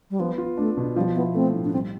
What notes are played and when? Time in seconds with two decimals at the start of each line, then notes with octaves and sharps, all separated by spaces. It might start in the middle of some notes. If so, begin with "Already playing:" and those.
0.10 G3
0.20 F3 B3
0.38 F4
0.57 A3 D4
0.77 B2
0.96 F3 G3
1.15 B3 E4
1.35 A3 C4
1.54 A2
1.64 D4
1.73 G3 C4